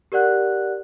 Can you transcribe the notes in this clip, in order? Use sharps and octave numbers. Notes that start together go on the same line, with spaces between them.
G4 A#4 D5 F#5 F#6